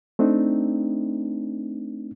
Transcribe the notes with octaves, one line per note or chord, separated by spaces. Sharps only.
A3 C4 D4 D#4